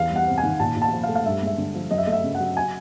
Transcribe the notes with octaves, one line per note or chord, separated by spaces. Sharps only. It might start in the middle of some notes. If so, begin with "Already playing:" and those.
Already playing: E2 F5
G3
F#5
C3
G#5
D#3
A#2 A5
A#2
A5
F3
F5
A3
F5
G2 E5
G#3 E5
D3
F3
F#2 D#5
E5
A3 D#5
E5
C#3
F#5
F#3
G#5